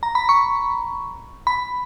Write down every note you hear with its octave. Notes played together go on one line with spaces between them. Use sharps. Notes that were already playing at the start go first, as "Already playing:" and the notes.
A#5
B5
C#6
B5